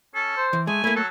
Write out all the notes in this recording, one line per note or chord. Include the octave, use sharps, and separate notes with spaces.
C#4 A4
C5
E3
G#3 A3 G#5
A3 A#3 E4
F#3 A4